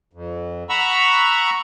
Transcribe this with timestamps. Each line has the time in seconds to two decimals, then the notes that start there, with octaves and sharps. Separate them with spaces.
0.13 F2
0.69 F#5 A#5 B5 C#6 E6